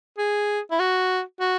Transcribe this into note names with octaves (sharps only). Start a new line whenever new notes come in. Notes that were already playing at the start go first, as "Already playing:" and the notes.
G#4
E4
F#4
F#4